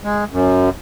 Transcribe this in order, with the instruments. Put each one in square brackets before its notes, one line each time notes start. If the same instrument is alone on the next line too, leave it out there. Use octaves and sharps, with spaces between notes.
[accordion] G#3
F#2